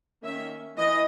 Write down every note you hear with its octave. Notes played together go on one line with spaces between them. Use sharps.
D#3 A#3 C#4 E5
E3 D#5